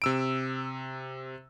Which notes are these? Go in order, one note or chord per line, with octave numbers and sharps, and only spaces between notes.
C3 E6 D7